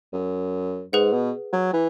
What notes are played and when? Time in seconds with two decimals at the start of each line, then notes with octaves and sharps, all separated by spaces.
0.13 F#2
0.93 G#2 G#4 B4 F#5
1.13 B2
1.53 F#3
1.73 E3